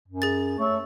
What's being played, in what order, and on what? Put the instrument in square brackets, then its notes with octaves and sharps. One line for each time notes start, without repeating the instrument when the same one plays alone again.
[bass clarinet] F#2
[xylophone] G#4 A6
[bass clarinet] A3 [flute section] C#5 C#6 E6